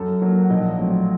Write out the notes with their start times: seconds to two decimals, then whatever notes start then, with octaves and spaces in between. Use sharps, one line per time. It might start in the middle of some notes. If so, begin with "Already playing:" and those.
Already playing: F#2 A4
0.22 F#3 A#3
0.43 F#5
0.50 A#1 D#5
0.78 A2 F#3 C4